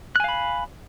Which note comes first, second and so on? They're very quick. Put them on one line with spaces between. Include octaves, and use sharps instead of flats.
F#6 G#5 F5 B5